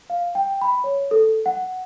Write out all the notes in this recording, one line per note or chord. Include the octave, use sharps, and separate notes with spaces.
F5
G5
B5
C#5
A4
F#5